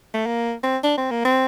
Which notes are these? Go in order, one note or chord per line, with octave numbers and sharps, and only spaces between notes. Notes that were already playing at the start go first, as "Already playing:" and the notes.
A3
A#3
C4
D4
C4
A#3
C4